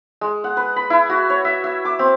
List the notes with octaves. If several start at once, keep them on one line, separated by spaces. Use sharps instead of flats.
G#3
F#5
B4
B5
E4
F#4
C#5
E5
E5
D6
C4